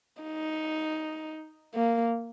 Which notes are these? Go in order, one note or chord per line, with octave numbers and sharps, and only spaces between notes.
D#4
A#3